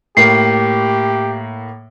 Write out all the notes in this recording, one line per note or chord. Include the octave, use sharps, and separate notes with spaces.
A2 A#3 G4 C7